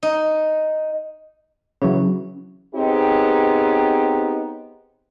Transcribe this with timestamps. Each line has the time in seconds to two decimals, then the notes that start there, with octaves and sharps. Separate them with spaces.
0.03 D#4
1.82 C#3 E3 F#3 C#4
2.75 B3 C4 D#4 G4 G#4 C#5